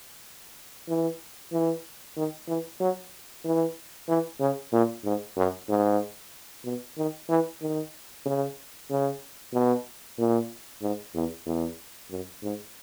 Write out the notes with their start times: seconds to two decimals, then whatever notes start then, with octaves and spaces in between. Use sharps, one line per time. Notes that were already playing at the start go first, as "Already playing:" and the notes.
0.88 E3
1.52 E3
2.17 D#3
2.48 E3
2.80 F#3
3.45 E3
4.08 E3
4.40 C#3
4.73 A#2
5.04 G#2
5.37 F#2
5.69 G#2
6.64 B2
6.97 D#3
7.29 E3
7.62 D#3
8.26 C#3
8.90 C#3
9.53 B2
10.18 A#2
10.82 G#2
11.14 E2
11.46 E2
12.11 F#2
12.43 G#2